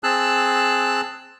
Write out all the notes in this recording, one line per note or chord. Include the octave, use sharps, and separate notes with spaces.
C4 G#4 A5 E6 F#6